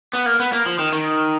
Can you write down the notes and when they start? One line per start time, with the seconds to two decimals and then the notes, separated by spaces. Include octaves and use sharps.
0.13 B3
0.26 A#3
0.40 B3
0.53 A#3
0.66 F3
0.79 D#3
0.92 D#3